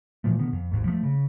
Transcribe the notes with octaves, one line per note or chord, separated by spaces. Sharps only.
A#2 E3 F3 A3
B2 D3 D#3 B3
F2
G#1 D#2 G#2
F3 F#3 A3
C#3